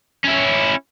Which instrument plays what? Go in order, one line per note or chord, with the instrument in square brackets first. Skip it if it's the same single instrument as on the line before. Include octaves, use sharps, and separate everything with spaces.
[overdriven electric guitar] C#4 E4